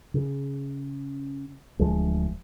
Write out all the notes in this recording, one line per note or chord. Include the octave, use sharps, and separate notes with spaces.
C#3
D1 D2 F3 G#3